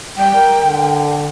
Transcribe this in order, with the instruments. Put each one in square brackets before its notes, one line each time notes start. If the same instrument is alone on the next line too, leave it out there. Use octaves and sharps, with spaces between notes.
[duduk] G3 [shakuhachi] G5
[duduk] A#4
D3